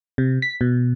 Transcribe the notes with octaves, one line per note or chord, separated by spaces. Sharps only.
C3
B6
B2